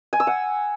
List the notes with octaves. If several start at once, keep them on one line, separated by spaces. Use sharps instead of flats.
G#5
E6
F#5